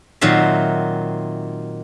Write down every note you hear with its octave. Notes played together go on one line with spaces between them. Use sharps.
A#2 D#3 F#3 C4 E5